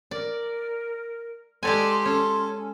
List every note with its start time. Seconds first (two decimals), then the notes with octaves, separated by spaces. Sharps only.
0.11 A#4 D5
1.63 G#3 G4 A4 D5 G#5 C6
2.05 C#4 A4